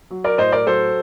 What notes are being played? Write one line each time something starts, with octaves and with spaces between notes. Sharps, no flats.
F#3
A#4 D5
A2 C5 D#5
A#4 D5
F#3 A4 C5